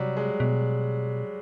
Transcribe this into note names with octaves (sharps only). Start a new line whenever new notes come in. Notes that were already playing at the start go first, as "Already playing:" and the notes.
Already playing: C3 F#3 G3
G#3
B2